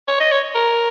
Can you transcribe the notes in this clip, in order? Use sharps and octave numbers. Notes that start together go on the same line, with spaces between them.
C#5
D#5
C#5
A#4